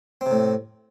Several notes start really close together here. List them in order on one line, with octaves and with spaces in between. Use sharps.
C4 C3 A2